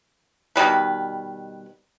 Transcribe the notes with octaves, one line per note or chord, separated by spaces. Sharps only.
B2 D#3 G3 B4